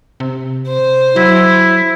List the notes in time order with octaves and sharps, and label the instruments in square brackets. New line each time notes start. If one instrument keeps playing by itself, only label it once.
[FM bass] C3
[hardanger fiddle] C5
[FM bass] F#3 [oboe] E4